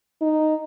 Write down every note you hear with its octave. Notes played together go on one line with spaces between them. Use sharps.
D#4